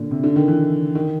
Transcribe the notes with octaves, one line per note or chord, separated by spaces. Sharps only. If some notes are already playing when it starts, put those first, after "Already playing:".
Already playing: A#2 D3
C3
D3
D#3
E3
D#3